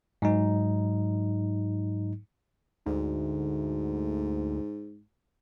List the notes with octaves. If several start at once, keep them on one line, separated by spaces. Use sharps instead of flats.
G#2 F#3 D#4
D2 G#2